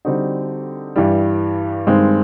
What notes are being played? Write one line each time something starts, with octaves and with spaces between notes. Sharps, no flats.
D3 G3 C4 D#4 F#4
G2 E3 G3
G2 D#3 G#3 C4